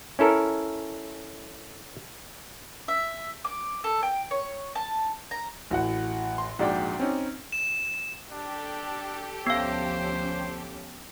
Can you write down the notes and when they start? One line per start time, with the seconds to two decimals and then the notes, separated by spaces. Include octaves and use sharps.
0.19 C#4 E4 A4 A#4
2.88 E5
3.45 D6
3.84 A4
4.03 G5
4.31 C#5
4.75 A5
5.31 A#5
5.71 A1 F#4 F#5
6.38 C6
6.59 A#1 G#2 F#4 D5 G5
6.99 C4 C#4 D#4
7.52 E7
8.32 D4 G4 A4
9.47 D2 F3 B3 C#4 C5 F5